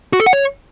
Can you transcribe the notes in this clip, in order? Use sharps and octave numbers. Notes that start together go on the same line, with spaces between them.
F#4
A4
F#5
C#5